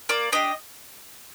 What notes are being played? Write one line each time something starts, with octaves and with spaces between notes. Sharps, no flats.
A#3 D5
D4 G4 D#5